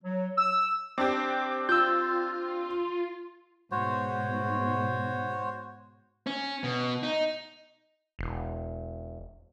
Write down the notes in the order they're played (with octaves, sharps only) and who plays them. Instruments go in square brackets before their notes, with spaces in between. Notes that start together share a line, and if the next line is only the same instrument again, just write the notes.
[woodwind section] F#3
E6
[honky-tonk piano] C4 D4 G4 [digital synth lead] D6
[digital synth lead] F4 [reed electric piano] E6 G6
[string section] G#2 B2 [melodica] F#4 C5 C#5
[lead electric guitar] C#4
B2
D#4
[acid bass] E1